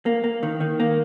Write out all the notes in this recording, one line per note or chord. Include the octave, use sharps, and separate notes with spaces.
A#3
A#3
D#3
D#3
A#3